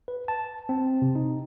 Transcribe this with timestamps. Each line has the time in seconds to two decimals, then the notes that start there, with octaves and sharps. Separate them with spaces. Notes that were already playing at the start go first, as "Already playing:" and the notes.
0.08 B4
0.28 A5
0.69 C4
1.02 C3
1.15 D#4